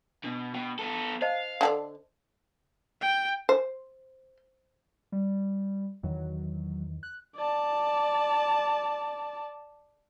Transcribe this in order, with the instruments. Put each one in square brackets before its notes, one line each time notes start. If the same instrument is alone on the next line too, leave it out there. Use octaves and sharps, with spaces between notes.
[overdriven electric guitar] B2 [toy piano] D4
[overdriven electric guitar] B2 [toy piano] G5
[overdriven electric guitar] B3 A4
[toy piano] C5 D#5 A5 [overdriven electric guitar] F5
[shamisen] D3 A4 D5
[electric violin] G5
[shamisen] C5
[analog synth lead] G3
[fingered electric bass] E2 D#3 E3 [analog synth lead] F#3
[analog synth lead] F#6
[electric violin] D5 A5